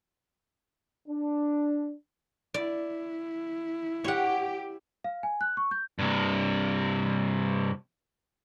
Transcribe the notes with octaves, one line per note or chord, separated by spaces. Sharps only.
D4
E4 D5
G4 C#5 F#5
F5
G#5
F#6
C#6
G6
G2 C3